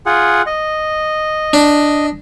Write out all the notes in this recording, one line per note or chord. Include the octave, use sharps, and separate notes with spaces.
F4 G#4 F#5
D#5
D4